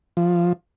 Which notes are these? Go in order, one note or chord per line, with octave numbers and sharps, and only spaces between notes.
F3